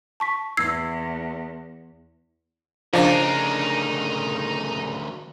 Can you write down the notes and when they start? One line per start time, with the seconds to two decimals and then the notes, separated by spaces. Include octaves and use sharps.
0.20 A5 C#6 B6
0.57 E2 E6 G#6 C7
2.94 D2 C#3 F3 D4 D#4 A#4